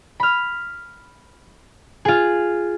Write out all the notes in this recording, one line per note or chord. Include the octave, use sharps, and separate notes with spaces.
B5 F6
F4 G#4